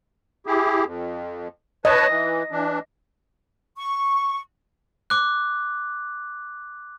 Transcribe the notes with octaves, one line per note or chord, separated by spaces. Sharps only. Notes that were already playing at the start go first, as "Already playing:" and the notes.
E4 G4 G#4
F2
B4 C#5 D#5 A5
E3
E3 D4
C#6
D6 F#6